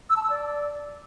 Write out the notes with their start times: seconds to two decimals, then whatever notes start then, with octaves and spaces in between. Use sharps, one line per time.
0.10 E6
0.16 A5
0.23 E6
0.30 D5